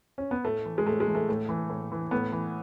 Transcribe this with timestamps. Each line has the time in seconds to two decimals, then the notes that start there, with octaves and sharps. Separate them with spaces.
0.18 C#4
0.31 B3
0.45 A2 A3
0.65 E3
0.78 G#3
0.87 A2 A3
1.00 G#3
1.08 E3
1.15 A3
1.29 A2
1.49 E3
1.69 A2
1.92 E3
2.11 A2 B3
2.32 E3